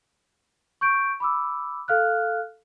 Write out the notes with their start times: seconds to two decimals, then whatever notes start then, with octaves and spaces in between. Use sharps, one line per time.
0.81 C#6 G6 D7
1.20 B5 D6 E6
1.88 A4 F5 F6 F#6